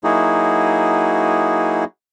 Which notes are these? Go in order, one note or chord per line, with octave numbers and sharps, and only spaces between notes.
F#3 A#3 D#4 E4 F#4 G#4